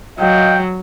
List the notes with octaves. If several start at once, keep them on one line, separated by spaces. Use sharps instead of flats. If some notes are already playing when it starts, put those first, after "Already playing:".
F#3 D#5 F5 G5